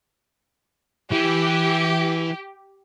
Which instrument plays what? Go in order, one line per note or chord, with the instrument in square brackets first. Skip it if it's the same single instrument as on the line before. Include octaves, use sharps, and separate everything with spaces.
[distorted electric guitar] E3 [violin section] G4